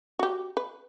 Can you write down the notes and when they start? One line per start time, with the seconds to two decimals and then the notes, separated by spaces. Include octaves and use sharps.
0.19 F#4 G4
0.57 B4